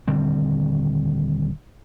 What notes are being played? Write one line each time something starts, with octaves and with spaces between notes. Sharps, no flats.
D#1 D3 G3 C4